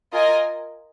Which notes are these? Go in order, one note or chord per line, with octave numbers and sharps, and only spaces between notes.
F4 A#4 D#5 G#5